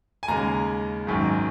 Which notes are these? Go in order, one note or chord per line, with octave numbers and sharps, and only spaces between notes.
G#5
D#2 C#3 G#3 A#5
G#1 F#2 D#3